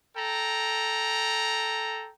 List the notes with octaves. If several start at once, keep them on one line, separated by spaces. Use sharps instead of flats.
A4 G5 A#5